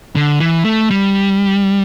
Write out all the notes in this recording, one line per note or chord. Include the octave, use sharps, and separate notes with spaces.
D3
E3
A3
G3